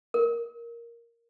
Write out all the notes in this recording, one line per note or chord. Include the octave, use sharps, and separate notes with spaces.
A#4